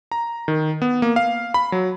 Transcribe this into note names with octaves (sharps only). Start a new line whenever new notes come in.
A#5
D#3
B3
A#3
F5
B5
F#3